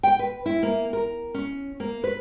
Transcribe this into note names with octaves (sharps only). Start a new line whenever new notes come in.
G5
B4
E4
A#3
A#4
C#4
A#3
B4